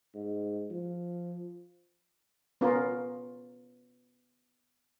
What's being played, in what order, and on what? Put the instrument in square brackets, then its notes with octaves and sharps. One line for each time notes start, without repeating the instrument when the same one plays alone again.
[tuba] G#2
F3
[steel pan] B3 C#4 F4 A#4